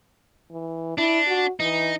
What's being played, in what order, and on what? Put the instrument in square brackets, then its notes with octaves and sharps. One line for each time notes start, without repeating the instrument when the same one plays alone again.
[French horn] E3
[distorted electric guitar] D4 [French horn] E4
[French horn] F#4
[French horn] E3 [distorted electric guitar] D#4